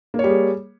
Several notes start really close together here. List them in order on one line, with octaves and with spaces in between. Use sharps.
A#3 C#5 G3 G#4